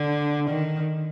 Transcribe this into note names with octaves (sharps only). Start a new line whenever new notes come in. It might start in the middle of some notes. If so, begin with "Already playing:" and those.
Already playing: D3
D#3